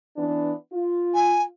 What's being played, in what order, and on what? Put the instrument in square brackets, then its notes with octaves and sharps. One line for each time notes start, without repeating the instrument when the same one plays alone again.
[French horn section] E3 B3 D4
F4
[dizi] G#5